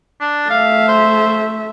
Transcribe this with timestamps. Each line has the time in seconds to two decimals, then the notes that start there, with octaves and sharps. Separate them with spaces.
0.21 D4
0.50 A3 E5 F5
0.89 C5